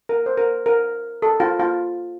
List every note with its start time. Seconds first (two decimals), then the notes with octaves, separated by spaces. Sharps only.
0.09 A#4
0.26 C5
0.38 A#4
0.66 A#4
1.22 A4
1.40 F4
1.60 F4